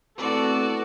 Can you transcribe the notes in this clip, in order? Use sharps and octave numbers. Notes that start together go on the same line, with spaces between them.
A3 B3 C4 E4 F#4 A4 D5